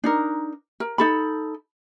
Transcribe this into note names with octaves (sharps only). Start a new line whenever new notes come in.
D4 D#4 A#4
A#4
D#4 A4 B5